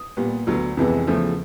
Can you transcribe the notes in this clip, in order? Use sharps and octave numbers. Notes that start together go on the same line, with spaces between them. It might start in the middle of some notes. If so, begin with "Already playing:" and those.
Already playing: D#6
A#2 G3 B3
D2 D3 F#3 B3
F2 C3 E3 G#3 B3
E2 C#3 F3 A3